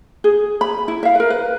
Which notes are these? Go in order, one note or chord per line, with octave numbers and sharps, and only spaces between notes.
G#4
B5
E4
E5 F5
A#4 B4
B4